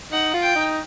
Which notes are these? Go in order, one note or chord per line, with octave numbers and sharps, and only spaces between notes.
D#4 F#5
F4
G5
D#4